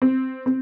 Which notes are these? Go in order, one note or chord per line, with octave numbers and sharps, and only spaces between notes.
C4
C4